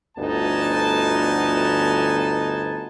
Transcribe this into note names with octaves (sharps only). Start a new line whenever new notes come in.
G1 D2 B3 D#4 G#5 A5